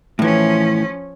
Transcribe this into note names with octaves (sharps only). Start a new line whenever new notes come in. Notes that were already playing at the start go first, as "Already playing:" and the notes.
A2 E3 F3 C#4